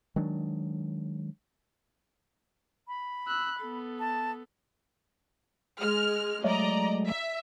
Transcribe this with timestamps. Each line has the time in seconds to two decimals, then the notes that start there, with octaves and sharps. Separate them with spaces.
0.16 D#3 F#3 G#3 D4
2.88 B5
3.27 E6 F#6
3.60 B3 A4
3.99 A5
5.79 G#3 F6
6.44 F#3 G#3 A3 D5 D#5 A#5
7.07 E5